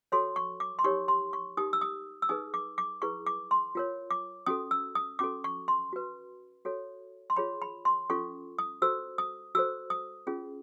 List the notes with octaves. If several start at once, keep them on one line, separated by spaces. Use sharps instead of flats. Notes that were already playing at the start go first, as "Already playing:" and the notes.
F#4 A4 C#5 C6
C#6
D6
C6
D#4 G4 A#4 C#5 C#6
C6
C#6
D#4 G4 A#4 D#6
E6
D#6
E6
D#4 G#4 B4 D#6
D6
D6
E4 G#4 B4 C#6
D6
C6
F4 A#4 C#5
D6
C#4 F#4 A4 D#6
E6
D#6
C#4 F#4 A4 D6
C#6
C6
F#4 B4
F#4 A4 C#5
C6
F4 G#4 C#5 B5
B5
C6
C#4 F4 A4 C#6
D#6
F#4 A4 C5 E6
D#6
F#4 A4 C5 E6
D#6
C#4 F4 G#4